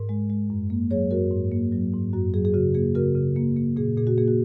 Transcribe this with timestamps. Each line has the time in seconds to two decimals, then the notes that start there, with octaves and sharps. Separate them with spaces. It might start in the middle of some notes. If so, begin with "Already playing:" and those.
Already playing: G#2 A#4
0.09 G#3
0.30 G#3
0.50 F#2
0.70 A#3
0.91 F#3 G#4 C#5
1.11 F#2 F#4 A#4
1.31 G#2
1.51 A#3
1.72 F#3
1.93 G#2
2.13 F#2 F#4
2.34 F#3 G#4
2.45 G#4
2.54 C#3 F#4
2.75 A#3 G#4
2.95 C#3 F#4 A#4
3.15 C#3
3.36 A#3
3.56 A#3
3.76 A#2 G#4
3.97 A#2 G#4
4.07 F#4
4.18 A#3 G#4
4.28 F#4